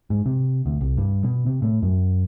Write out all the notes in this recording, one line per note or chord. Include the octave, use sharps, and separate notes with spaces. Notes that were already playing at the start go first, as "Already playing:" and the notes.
G#2
C3
D2
C2
G2
B2
C3
A2
F#2